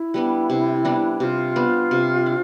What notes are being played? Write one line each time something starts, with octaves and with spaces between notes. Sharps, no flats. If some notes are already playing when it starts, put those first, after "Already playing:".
Already playing: E4
G3 B3 D4
C3
G3 B3 D4
C3 F4 G4
G3 B3 D4
C3
D4